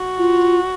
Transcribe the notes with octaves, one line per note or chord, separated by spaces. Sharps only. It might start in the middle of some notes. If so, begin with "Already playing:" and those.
Already playing: F#4
F4